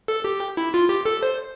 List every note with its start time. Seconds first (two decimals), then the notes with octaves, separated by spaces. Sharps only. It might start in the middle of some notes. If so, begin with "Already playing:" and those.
0.08 A4
0.24 G4
0.57 E4
0.74 F4
0.89 G4
1.05 A4
1.23 C5